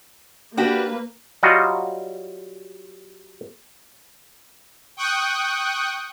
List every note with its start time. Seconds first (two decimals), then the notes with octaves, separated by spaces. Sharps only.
0.57 A#3 D4 F#4 G4 B4
1.43 F#3 G3 F4 F#4 D#5
4.97 G5 C#6 D#6 F#6